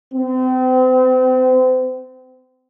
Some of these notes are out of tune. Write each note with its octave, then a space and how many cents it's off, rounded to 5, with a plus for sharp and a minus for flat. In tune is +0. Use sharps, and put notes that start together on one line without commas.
C4 -35